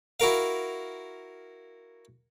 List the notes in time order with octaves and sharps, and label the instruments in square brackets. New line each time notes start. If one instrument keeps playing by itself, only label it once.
[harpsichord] E4 F#4 A#4 F5